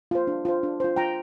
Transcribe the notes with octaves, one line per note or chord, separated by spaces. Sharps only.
F4 C5
D4
F4 C5
D4
F4 C5
F4 G5 A#5